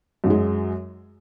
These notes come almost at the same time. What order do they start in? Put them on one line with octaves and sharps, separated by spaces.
F#2 F#3 G#3